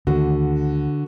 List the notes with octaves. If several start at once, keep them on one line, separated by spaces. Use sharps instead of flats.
D2 D3 D#3 F#4